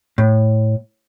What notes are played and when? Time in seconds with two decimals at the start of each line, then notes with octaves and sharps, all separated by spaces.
0.18 A2